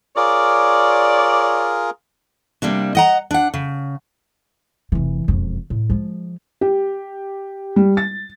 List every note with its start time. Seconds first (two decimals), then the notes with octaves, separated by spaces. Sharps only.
0.16 F4 G#4 A#4 C#5 D5
2.62 C3 G3 A#3 D4
2.95 D#5 F#5 A#5
3.31 D4 F#5
3.54 C#3
4.92 F1 E3
5.28 E1 F2
5.70 A2
5.90 F3 G#3
6.61 G4
7.76 G3
7.97 A6